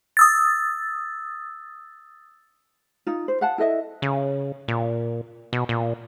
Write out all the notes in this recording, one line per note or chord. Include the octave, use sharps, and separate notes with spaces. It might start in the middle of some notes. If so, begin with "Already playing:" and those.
D#6 E6 A6
D#4 F4
C5
F5 F#5 A5
E4 A4 D#5 E5
C#3
A#2
B2
A#2